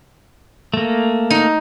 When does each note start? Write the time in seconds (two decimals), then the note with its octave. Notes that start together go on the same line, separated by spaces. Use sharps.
0.74 A3 A#3
1.30 D#4